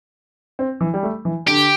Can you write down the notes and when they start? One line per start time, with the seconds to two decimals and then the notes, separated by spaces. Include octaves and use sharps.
0.59 C4
0.81 E3
0.94 G3
1.03 A3
1.25 E3
1.47 D3 G4